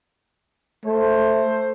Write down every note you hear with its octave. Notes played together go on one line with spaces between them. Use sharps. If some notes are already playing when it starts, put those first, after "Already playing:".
A3 A4 C5